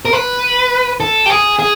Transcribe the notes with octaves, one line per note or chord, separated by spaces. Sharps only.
A#4
B4
A4
G4
G#4
G#4